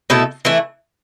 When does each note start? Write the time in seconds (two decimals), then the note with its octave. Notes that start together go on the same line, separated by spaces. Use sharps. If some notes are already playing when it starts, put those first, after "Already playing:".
0.10 B2 A3 E4 A4
0.45 E3 A3 E4